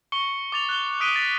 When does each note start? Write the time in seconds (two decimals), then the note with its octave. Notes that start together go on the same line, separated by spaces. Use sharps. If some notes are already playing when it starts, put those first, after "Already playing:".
0.12 C#6 C#7 G7
0.52 D6 A6 F7
0.69 F#6 G7
1.00 D#6 F#6 B6 D7 D#7 G7
1.16 A6 B6